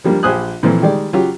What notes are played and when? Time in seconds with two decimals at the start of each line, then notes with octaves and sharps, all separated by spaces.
0.04 F3 G3 A#3 D4
0.23 A#1 G4 C5 G#5 D#6 F#6
0.63 A#2 E3 F3 A3 C4
0.82 D#3 G3 G#3 D5
1.13 C#3 F#3 F4 G4